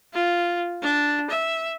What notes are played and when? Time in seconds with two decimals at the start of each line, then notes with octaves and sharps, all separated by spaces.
0.14 F4
0.82 D4
1.30 E5